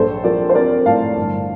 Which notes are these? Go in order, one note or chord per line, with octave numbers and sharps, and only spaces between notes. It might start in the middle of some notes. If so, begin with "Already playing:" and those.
Already playing: A#1 A4 C5
F3 A#4 D5
C5
C4 A#4 D5
A2 F5 A5
G1